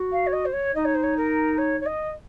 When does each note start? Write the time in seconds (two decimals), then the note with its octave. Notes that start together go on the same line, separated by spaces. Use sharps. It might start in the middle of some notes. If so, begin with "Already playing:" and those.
Already playing: F#4
0.12 F5
0.26 C#5
0.32 D#5
0.45 C5
0.53 C#5
0.74 D#4 D#5
0.85 C#5
0.94 C5
1.03 C#5
1.17 A#4
1.58 C#5
1.80 C#5
1.86 D#5